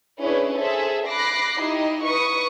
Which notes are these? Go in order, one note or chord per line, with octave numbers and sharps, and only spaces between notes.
C#4 D4 E4 G#4 B4
G#4 A4 C5 E5
B5 D6 F#6 A#6 C7
D#4 E4 G4 D#5
B4 C#6 D#6